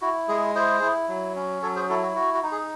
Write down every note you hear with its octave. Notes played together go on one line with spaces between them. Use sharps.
E4 F#4
G#3 G#4
E4 G#4 C5
E4
F#3
C#4
F#3 A4 C#5
G#4 C5
E4 F#4 A4
F#4
F#4
F#4
D#4
G#4